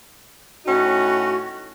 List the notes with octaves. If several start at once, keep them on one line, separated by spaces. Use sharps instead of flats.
A2 C#4 D#4 F#4